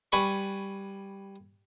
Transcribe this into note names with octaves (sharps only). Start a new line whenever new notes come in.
G3 B4 G#5 B5 C#6